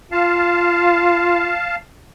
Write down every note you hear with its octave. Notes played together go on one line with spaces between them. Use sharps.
F4 F5 A5